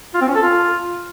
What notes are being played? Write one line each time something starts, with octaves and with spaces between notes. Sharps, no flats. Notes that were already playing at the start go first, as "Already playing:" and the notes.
F4
C4
C#4
A4
F4